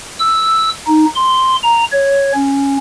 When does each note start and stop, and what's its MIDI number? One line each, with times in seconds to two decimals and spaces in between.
0.19 0.69 88
0.87 1.05 63
1.15 1.56 84
1.63 1.83 82
1.92 2.33 73
2.34 2.78 61